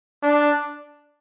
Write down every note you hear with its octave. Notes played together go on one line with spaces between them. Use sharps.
D4